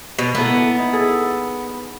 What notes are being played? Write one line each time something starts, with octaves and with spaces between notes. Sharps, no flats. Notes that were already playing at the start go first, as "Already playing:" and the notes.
B2
A#3 B3 E4 A4
D#4 E4
G#4 A4